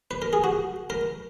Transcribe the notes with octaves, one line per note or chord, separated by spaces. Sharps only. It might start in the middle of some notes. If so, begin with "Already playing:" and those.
B4
A#4
G#4
F#4
A#4